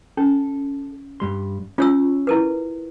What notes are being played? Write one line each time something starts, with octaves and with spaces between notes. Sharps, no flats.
C#4 A4
G2 G3 C6
C#4 F4 C#5 E6
E4 A#4 B4